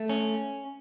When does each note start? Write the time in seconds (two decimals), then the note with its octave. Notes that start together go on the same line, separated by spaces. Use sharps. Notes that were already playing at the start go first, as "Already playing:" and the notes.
Already playing: A3
0.09 C#4